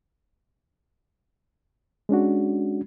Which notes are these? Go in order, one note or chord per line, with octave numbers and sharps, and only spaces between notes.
G#3 C#4 D4 F#4